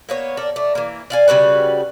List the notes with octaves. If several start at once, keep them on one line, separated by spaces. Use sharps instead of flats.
A#3 B3 C#5
A4 A#4 D5
A3 D5
E3 A#3
D5 F5 G#5
C#3 G3 F#4 B4